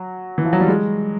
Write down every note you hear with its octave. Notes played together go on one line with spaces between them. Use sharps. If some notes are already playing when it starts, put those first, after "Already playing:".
Already playing: F#3
E3
F3
F#3
G3
G#3